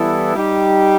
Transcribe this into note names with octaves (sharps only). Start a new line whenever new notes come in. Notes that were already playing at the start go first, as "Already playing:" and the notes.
Already playing: E3 G3 B3 E4 A4
G3 D#4 G4